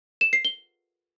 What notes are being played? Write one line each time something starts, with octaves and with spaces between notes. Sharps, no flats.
E7
C7
G7